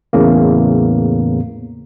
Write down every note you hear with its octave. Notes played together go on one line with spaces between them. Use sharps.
E2 A2 C#3 A#3